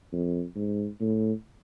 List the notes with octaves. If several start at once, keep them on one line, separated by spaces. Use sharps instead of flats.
F2
G#2
A2